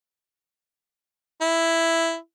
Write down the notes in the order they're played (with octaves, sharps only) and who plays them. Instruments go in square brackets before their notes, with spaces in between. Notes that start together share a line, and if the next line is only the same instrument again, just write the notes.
[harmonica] E4